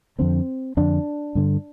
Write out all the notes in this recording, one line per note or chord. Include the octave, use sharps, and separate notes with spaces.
F2 D3 C4
F2 D3 D4
G2 D3